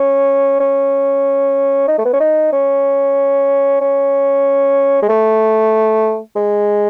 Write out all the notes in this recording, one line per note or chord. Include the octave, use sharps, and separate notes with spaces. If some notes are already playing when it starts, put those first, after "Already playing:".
Already playing: C#4
C#4
D#4
A3
B3
C#4
D#4
C#4
C#4
G#3
A3
G#3